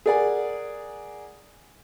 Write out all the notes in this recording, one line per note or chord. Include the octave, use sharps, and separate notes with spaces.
G#4 A#4 D5 F#5 G#5